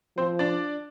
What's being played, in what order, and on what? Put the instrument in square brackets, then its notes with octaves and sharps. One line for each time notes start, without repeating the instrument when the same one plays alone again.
[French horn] F3 [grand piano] C4 C5
[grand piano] D4 D5